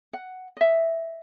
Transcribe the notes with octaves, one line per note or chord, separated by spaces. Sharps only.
F#5
D#5 E5